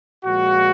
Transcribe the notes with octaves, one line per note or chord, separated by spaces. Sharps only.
A#2 F3 G#3 F#4